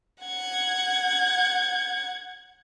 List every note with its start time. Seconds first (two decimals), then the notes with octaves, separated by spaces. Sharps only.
0.24 F#5 G#6